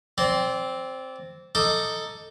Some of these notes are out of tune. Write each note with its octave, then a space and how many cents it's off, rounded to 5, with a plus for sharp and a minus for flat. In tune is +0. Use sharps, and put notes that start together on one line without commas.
C4 +0 D5 -25
D#4 +0 A4 +10 D6 +0